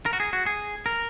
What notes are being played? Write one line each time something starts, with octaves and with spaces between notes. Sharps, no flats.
A#4
F#4
G#4
F#4
G#4
A#4